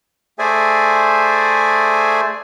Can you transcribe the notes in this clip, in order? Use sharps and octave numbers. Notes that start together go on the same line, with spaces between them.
A3 G#4 C5 D5 E5 G#5